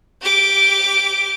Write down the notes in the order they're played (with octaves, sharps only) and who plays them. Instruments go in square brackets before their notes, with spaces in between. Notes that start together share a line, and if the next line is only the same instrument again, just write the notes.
[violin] G4 D6